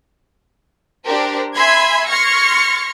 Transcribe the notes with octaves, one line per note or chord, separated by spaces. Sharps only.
D4 G4 A#4 C5
E5 G#5 B5 C6 G#6
C6 C#6 F6 G#6 A#6 C#7